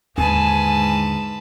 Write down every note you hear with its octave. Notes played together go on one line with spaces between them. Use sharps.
D#2 G#2 D3 B4 G#5 A5